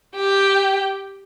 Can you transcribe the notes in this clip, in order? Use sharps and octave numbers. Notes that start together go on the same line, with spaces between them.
G4 G5